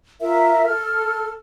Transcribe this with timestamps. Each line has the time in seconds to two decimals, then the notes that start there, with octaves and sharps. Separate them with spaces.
0.20 F4 A#4 E5
0.66 A4 F6